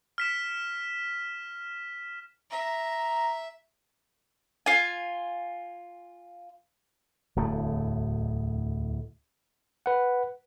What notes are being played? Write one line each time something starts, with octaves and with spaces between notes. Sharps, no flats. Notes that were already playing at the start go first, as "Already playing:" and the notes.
F6 B6 E7
E5 A#5
F4 G#5
D1 E2 A2 A3
B4 F#5